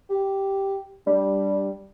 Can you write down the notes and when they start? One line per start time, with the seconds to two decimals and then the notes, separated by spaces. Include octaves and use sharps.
0.10 G4
1.07 G3 D4